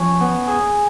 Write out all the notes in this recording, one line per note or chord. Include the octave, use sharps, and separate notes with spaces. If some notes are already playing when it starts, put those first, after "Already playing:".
Already playing: F3 C#4
B3
G#4